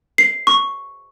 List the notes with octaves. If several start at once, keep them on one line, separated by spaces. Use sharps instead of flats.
C7
C#6